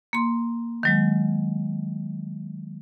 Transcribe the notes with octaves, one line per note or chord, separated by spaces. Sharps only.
A#3 C6
D#3 F#3 G#3